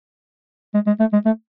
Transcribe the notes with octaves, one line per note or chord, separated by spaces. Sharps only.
G#3
G#3
A3
G#3
A3